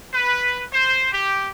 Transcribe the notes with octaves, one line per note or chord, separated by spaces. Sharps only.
B4
C5
G4